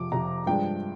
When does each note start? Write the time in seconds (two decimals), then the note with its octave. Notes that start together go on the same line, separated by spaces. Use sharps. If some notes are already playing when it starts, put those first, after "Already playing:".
Already playing: F2 C3 F3 D6
0.12 F2 C3 F3 A#5
0.47 G2 F3 G#3 D4 G5